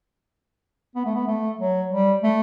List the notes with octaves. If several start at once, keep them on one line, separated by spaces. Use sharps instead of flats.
B3
A3
B3
A3
F#3
G3
A3